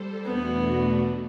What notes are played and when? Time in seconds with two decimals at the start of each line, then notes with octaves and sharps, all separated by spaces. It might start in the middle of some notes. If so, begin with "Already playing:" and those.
Already playing: G3 A4 C5
0.25 E2 B2 A3 B3 D4 F#4